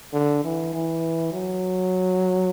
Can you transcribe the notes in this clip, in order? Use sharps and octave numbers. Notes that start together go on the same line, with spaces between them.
D3
E3
E3
F#3